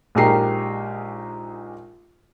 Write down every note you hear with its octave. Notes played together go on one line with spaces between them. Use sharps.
A#1 G#3 D#4 G4 A#4 C7